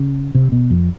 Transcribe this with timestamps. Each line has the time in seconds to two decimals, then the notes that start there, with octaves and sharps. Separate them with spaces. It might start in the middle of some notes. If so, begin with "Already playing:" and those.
Already playing: C#3
0.35 C3
0.52 B2
0.71 F2